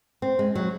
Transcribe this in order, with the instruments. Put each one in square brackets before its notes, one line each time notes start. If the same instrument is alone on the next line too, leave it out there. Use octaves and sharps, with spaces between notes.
[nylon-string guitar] C4
G#3
F#3